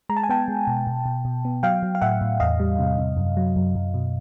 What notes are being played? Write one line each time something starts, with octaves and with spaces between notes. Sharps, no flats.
G#3 A#5
A5
G#5
B3 G5 A5
G#3
B2
B2
B2
B2
B3
F#3 F5 G5
F#3
F5
A2 E5 F#5
A2
E2 D#5 F5
G3
C3
C3
F#2
F#3
F#2
F#2
B2